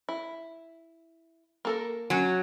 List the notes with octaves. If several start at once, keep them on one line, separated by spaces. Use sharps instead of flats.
E4
A#3 A4 A#4
F#3 C#4